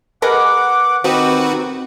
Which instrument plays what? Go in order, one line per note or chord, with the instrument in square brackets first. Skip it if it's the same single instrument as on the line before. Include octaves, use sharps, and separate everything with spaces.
[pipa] G#3 A#4 B4 [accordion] F#5 D6
[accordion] D#3 [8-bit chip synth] C4 F#4 B4 [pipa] D#4 G4